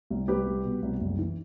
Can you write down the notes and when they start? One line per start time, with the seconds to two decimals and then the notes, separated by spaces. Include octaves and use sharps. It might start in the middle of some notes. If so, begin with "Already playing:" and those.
0.10 C2
0.28 C2 G4 B4
0.46 G3
0.64 B2
0.82 C2
1.01 F#1
1.19 E3